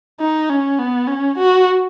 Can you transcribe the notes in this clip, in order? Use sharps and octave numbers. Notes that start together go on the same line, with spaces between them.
D#4
C#4
B3
C#4
F#4